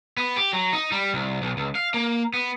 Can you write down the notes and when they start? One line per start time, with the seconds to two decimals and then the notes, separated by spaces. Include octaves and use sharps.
0.17 B3
0.37 G4
0.53 F#3
0.73 D#4
0.92 G3
1.14 C2
1.42 B1
1.57 C#2
1.75 F5
1.94 A#3
2.33 B3